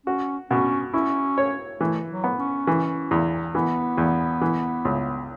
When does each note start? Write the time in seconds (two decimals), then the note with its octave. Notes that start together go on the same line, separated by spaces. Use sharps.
0.06 C#4 F#4
0.51 B2 C#4
0.94 C#4 E4
1.38 C#5
1.80 E3 A3
2.10 F#3
2.24 B3
2.39 C#4
2.67 E3
3.11 E2
3.54 E3 B3
3.98 E2
4.42 E3
4.85 C#2